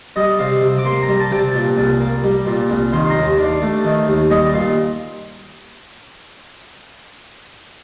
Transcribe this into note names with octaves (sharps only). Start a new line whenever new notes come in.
G3 D#5
C3 F5
C3
D6
A#3 C6
A#5
G3
A5
C3 G5
A5
A#2
C2
A#3
G3
A#2
C2
D#3 C6
A#5
D#2
D4
F5
A3
D#3
D#2
G3 D#5
A#2 F5